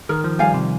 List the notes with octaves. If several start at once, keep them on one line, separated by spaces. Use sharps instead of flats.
D#3 A#4
F3
G3 F5 G#5
C3